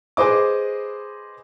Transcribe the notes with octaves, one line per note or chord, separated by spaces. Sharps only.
G#4 B4 C5 D#5 D6